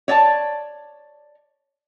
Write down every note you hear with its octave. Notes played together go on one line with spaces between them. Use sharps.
C#5 D5 G5 A5